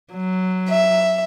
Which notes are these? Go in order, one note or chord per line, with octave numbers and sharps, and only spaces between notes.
F#3
E5